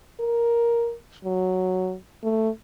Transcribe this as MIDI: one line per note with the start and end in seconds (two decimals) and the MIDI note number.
0.20 0.94 70
1.25 1.95 54
2.23 2.49 57